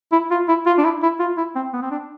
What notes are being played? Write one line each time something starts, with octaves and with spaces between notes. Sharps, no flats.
E4
F4
E4
F4
D4
E4
E4
F4
E4
C4
B3
C4
D4